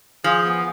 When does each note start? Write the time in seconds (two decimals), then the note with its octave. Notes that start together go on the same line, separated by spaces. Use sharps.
0.24 F3 G#4
0.45 B3